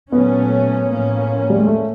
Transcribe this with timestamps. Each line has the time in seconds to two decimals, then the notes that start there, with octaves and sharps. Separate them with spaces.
0.11 A#2 F#3 A3 B3 C#4
0.89 A2 F3 A#3 C#4
1.50 G3
1.59 G#3
1.67 A3